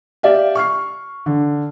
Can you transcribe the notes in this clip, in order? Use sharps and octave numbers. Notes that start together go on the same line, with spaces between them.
G4 D5 E5 F5
C#6 F6 C7
D3